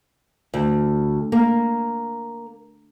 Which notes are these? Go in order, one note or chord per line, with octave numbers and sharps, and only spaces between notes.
D2
A#3